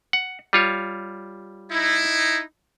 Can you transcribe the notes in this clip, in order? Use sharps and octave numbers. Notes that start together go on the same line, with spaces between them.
F#5
G3 F4 C#5
D#4 E4